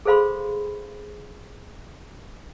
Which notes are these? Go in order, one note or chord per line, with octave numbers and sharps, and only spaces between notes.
G#4 A4 C5 F5 B5 C6